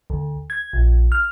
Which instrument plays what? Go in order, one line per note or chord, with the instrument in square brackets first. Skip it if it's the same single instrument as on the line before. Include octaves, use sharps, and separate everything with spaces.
[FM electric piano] D2
G#6
A#1
F6